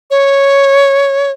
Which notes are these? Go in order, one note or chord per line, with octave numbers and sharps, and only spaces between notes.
C#5